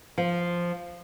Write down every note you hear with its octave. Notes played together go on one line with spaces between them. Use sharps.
F3